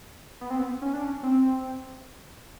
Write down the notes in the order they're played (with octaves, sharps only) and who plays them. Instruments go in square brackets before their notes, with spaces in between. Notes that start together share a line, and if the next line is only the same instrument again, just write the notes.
[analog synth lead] B3
C4
B3
C#4
D4
C#4
C4